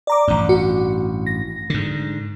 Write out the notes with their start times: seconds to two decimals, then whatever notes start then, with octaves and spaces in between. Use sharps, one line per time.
0.07 D5 A#5 D6
0.28 A1 G2
0.49 F#4
1.26 A#6
1.70 G#2 D3